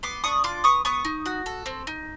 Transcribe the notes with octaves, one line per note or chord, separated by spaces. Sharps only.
B3 C6 D6
D4 C#6 D#6
F4 C6 D6
B3 C#6 D#6
B3 C#6 D#6
D#4
F#4
A4
C4
D#4